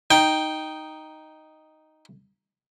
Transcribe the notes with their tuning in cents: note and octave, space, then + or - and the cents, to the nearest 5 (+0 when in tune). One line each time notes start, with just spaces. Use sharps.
D#4 +0 G5 +0